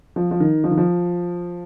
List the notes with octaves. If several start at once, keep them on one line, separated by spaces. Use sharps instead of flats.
F3
F3
D#3
F3
D#3
F3